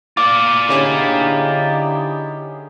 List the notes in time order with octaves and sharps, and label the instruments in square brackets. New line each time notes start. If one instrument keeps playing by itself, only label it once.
[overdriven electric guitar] F4 D5 [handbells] D6
[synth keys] D3 C#4 G#4 [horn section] D#4 E4 G4